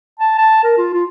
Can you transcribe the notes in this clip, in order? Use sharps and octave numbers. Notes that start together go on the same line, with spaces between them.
A5
A5
A#4
F4
F4